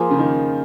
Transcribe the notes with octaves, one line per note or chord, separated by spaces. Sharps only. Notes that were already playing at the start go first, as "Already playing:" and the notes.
Already playing: F3 A#3 F4 G#4 C5
C#3
D#3